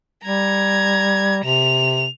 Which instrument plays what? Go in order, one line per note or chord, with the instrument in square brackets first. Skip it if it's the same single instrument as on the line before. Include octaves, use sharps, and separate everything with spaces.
[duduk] G3 [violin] A#5 G#6
[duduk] C3 [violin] F7